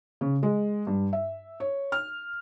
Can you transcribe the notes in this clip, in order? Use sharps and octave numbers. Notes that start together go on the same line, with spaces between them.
C#3
G#3
G2
E5
C#5
F6